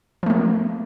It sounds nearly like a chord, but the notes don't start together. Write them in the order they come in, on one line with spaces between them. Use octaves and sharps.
F3 A3 A#3